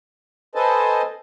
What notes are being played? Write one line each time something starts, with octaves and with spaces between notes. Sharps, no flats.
A4 B4 C5 D#5 G#5 A5